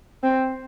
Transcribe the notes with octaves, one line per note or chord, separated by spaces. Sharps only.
C4